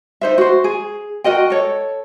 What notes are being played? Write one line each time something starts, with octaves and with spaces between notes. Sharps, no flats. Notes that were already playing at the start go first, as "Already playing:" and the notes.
D#4 C5 E5
F#4 C5
G#4
F#4 A#4 D#5 G5
A4 C#5